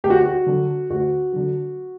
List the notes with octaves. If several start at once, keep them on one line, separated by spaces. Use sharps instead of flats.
D2 G4
F#4
F#4
D3 F#3
D2 F#4
D3 F#3